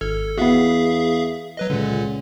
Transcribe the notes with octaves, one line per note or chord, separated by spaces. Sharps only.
G#1 A4 F6 G#6
E2 B3 F#4 G#4 E5 F5
F#3 B4 D#5
C#2 A#2 D3